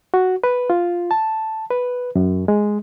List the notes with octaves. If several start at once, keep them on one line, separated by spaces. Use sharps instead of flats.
F#4
B4
F4
A5
B4
F#2
G#3